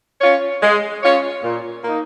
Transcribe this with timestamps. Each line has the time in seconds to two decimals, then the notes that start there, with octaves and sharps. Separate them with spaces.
0.21 C#4 F4 C#5
0.62 G#3
1.03 C#4 F4 C#5
1.43 A#2
1.84 A#3 D#4